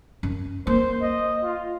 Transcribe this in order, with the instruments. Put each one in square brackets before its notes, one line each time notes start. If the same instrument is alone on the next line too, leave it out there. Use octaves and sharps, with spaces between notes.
[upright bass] F#2
[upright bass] A#3 [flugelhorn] C5
[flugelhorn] D#5
F4